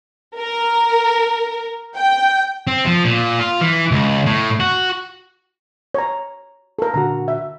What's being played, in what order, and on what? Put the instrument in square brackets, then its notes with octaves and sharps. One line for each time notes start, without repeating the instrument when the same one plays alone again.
[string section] A#4
G5
[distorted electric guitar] C4
F3
A#2
F4
E3
C#2
A2
F#4
[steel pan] C#5 A#5
A4 A#4
[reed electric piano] A#2 D3 F#4 [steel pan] A#5
[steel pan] E5